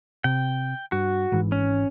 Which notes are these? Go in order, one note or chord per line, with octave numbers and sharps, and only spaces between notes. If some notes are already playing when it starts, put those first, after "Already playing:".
C3 G5
G2 F#4
G#1 G#2 E3
C#4